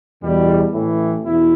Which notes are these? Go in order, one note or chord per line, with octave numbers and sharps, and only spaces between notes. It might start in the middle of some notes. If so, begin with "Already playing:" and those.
E2 B2 G3
A1 A2 E3
E2 B2 B3 E4